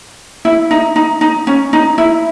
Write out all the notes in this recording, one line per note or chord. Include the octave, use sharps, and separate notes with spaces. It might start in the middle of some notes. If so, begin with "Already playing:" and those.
E4
D#4
D#4
D#4
C#4
D#4
E4